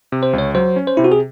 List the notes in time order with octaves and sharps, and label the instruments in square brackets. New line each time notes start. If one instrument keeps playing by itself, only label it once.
[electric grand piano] C3
[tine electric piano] C5
[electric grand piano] C#2
[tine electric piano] C#5
[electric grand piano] F#3 [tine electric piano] C5
[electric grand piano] C#4
[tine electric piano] C5
[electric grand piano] C3 [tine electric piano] E4
[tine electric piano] F#4
G#4